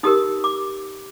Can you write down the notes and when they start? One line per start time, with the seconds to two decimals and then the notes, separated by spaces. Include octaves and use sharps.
0.03 D#4 G4 A#4 D#6
0.44 D6